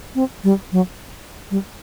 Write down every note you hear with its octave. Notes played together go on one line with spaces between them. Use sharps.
C4
G3
F#3
G3